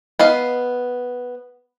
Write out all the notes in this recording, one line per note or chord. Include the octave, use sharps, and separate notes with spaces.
B3 D#5 F5